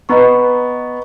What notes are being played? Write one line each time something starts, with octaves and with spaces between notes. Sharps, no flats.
B3 B4 D#5 A#5 C#6